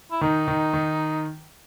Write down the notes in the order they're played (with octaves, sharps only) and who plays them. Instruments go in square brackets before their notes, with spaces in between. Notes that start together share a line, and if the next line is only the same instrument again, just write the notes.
[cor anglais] E4
[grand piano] D#3 [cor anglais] D#4
[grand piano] D#3
D#3